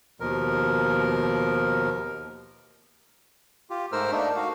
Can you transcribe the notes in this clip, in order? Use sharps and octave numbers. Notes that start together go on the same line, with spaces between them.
D#2 B2 F3 A#4
F4 G4
G#2 A3 A#4 C5 E6 F6
A3 A#3 D4 D#4
F#4 F5